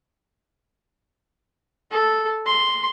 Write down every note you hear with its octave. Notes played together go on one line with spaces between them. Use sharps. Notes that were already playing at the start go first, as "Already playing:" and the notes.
A4
C6